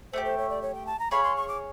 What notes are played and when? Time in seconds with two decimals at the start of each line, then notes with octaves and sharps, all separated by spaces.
0.13 A3 D4 G4 C5
0.25 C5
0.38 C#5
0.50 D5
0.62 C#5
0.75 G5
0.87 A5
0.99 A#5
1.11 G#4 C#5 F5 B5
1.24 C6
1.36 C#6
1.48 D6